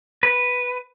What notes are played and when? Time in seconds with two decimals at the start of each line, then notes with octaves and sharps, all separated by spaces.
0.23 B4